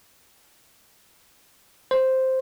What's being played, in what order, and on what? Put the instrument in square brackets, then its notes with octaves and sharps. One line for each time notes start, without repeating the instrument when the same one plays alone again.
[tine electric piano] C5